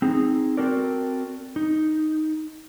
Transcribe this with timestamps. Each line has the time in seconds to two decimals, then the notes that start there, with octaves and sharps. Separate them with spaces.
0.02 C4 D#4 G#4
0.57 C4 F#4 A4 A#4 D5
1.56 D#4